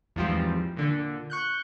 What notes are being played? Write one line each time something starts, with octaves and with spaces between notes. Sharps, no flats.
E2 G#2 F3 G3 C4
A#2 D3
C#6 F#6 G6